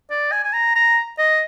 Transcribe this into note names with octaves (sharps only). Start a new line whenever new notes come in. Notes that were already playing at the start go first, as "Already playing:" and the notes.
D5
G#5
G#5
A#5
A#5
D#5